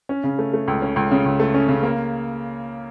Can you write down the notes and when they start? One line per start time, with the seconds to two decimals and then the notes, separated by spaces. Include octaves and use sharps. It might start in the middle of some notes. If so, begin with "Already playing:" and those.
0.09 C#4
0.24 C#3
0.39 A3
0.54 A3
0.68 C#2
0.82 C#4
0.96 C#2
1.11 C#3
1.25 C#2
1.40 A3
1.54 C#4
1.68 C#3
1.83 A#3